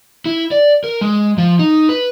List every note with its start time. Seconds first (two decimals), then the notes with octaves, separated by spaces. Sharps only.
0.26 E4
0.51 D5
0.84 A#4
1.01 G#3
1.38 F3
1.59 D#4
1.89 B4